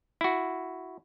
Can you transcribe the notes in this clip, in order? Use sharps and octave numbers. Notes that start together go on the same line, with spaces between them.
E4 F#4